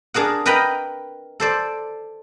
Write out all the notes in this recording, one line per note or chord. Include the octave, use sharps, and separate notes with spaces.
D4 G#4 A#4 F#5
A#4 B4 D#5 G5 A#5 B5
A4 C5 D5